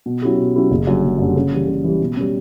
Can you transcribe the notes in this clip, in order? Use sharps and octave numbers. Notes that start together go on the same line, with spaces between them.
B2
F#3 C#4 E4 G4
B2
F#3 C#4 E4 G4
F#1
F#2 D3 G3
F#1
F#2 D3 G3
C#3
E3 G3
C#3
E3 G3
B2
G3 C#4